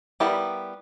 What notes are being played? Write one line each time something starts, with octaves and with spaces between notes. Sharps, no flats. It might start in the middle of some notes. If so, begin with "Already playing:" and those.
G3 B3 E4 G4 A#4